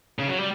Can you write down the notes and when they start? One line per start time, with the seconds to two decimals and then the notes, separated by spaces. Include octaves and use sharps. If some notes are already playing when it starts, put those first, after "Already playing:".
0.19 C#3
0.28 F#3
0.38 G3